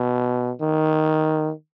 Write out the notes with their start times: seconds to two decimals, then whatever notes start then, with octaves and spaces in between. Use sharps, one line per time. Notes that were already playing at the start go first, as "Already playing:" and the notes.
Already playing: B2
0.61 D#3